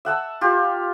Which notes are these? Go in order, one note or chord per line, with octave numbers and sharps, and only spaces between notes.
E5 F#5 A5 E6
F4 G4